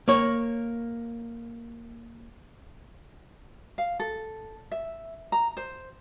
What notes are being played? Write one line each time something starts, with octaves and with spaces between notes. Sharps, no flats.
A#3 C#5
F5
A4
E5
A#5
C5